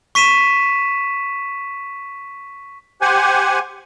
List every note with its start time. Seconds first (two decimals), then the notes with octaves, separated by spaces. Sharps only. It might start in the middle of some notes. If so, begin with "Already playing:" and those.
0.15 C#6 B6 D#7 E7
3.01 G4 C5 F#5 G#5